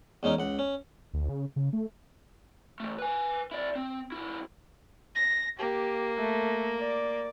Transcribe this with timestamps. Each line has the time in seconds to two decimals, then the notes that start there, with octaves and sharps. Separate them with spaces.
0.23 E2 G#3 C#4 D#4 A#4
0.39 C#2 F#5
0.59 C#4
1.13 D2
1.29 C#3
1.56 C#3
1.73 A3
2.80 E3 A3
2.98 B4 G#5
3.51 E4 D5
3.75 C4
4.12 B1 E4
5.15 A#6
5.59 A#3 G4
6.18 A3
6.80 D5